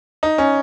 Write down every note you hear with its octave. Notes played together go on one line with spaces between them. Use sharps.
D#4
C#4